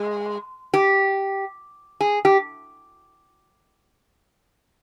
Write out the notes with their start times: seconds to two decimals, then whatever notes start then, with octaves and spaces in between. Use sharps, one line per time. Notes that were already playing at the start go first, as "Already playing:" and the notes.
Already playing: G#3
0.74 G4
2.01 G#4
2.25 G4